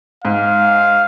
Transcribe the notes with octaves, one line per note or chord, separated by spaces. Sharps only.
G#2 F5